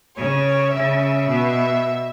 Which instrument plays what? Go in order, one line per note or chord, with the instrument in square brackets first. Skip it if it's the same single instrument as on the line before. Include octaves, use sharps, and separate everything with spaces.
[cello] C#3 [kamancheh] C#5
[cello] C#3 [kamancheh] E5
[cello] B2